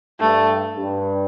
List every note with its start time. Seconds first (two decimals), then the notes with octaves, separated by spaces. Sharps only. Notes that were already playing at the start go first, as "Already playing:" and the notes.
0.20 G2 A3
0.77 G2